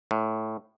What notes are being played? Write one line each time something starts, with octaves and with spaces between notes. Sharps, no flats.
A2